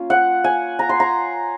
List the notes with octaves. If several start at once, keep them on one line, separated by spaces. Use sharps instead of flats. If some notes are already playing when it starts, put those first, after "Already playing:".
Already playing: A#3 C#4 F4
F#5
G#5
A#5
C6
A#5